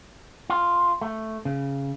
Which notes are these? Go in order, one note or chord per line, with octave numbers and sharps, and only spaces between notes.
F4
A3
C#3